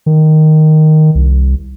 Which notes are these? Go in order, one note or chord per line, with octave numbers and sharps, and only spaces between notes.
D#3
C2